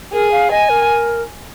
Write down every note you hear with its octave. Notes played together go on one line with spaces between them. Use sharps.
G#4 A#4
F5
D#5 G#5
A#4